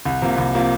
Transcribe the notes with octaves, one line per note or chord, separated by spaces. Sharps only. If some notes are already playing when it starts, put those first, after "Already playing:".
C2
C3 F3 A#3
C2
C3 F3 A#3